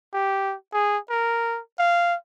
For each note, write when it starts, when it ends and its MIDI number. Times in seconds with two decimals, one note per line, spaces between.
0.14 0.55 67
0.73 0.98 68
1.10 1.59 70
1.79 2.15 77